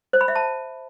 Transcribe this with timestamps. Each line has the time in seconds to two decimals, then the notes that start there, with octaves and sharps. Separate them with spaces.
0.13 C5
0.21 B5
0.28 E5
0.36 A5